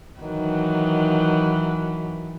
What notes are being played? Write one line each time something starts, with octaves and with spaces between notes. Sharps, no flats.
D#3 E3 F#3